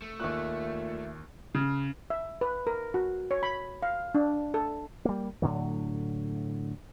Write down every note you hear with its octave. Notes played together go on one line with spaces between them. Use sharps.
A3
D#2 A#2 E5 C#6 F#6
C#3
E5
B4
A#4
F#4
C#5
B5
F5
D4
A4
G3 A#3
A2 D3 F#3